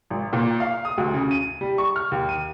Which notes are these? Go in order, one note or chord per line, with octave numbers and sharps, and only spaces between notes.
G#1
A#2
F5
D#6
D2
C#3
D#7
G3
C#6
F6
D#2
D#7